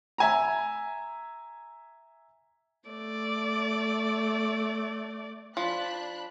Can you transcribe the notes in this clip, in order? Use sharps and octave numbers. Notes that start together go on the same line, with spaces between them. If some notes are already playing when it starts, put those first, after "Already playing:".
E5 G#5 A#5
A3 D5
F3 D4 B5 F#6